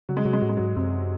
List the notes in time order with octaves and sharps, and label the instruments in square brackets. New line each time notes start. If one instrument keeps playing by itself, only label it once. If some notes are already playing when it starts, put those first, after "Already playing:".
[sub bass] C#3 [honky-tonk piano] F#3
[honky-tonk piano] G#3
[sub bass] C3 [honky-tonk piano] F#3
[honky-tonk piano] G#3
[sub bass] A2 [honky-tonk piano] F#3
[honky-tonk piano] G#3
[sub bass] G#2 [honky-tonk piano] F#3
[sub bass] F#2 [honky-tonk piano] C3